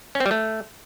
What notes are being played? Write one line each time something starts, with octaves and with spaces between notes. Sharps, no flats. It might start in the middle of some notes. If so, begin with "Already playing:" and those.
C#4
C4
G3
A3